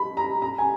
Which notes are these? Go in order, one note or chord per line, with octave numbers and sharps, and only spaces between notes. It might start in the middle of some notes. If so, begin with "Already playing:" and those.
Already playing: B5
A#5
A#5
G#5